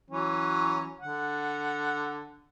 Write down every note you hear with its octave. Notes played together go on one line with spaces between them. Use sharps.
E3 F#3 C#4
D3 F#5